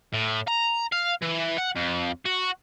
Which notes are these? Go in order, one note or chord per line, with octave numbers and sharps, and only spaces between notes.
A2
A#5
F5
E3
F#5
F2
F#4